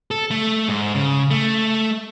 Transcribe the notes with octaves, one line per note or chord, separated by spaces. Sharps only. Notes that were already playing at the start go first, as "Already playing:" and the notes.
A4
A3
G#2
C#3
A3